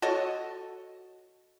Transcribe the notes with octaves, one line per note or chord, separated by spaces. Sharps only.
F#4 A4 C#5 D#5